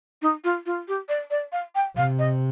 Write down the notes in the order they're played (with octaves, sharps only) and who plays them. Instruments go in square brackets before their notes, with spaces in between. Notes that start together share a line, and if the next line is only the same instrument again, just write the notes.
[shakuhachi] D#4
F4
F4
G4
D5
D5
F5
G5
[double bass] C3 [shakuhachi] F5
[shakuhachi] D#5